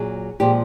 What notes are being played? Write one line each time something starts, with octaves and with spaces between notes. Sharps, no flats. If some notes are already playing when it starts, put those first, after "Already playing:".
Already playing: A#2 F#3 G#4
A#2 F3 G#3 G4